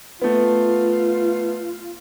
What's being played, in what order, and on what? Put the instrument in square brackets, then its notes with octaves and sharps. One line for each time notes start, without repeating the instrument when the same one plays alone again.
[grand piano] A3 B3 [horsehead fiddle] F4